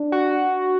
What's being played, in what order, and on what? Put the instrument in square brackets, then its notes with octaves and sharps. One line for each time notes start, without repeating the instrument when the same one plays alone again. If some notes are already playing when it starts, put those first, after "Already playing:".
Already playing: [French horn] D4
[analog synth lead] F#4